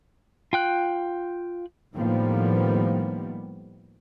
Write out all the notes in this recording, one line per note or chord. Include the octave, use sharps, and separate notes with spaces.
F4 G5 F#6
A2 D#3 F3 G3 A#3 B3